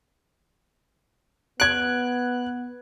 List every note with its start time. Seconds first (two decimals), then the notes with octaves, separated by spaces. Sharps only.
1.60 B3 F#6 G#6 D7